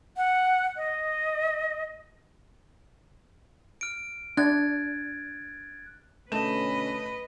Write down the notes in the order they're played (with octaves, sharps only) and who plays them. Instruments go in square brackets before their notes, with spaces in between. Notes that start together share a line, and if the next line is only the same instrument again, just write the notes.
[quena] F#5
D#5
[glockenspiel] F6 D7
[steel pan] D4 [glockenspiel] F#6 G#6 A6
[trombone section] B2 D3 C#4 [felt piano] A3 E7 [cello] B4 [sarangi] D#5